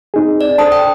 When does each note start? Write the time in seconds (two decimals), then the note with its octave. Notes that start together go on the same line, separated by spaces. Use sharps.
0.14 C4 D#4 G#4
0.41 D5
0.58 D4 A4 C5 A5 D#6
0.72 G5